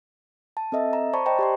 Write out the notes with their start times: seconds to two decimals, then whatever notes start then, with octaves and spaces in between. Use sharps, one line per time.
0.57 A5
0.72 C4 A4 D#5 E5
0.93 A#5
1.13 C5 D5 A5 B5 C#6
1.26 C5 D#5 G5 A5 A#5
1.39 G4 D5 C6